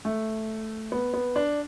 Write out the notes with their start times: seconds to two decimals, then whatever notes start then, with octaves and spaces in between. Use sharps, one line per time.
0.05 A3
0.92 B3
1.14 B3
1.36 D4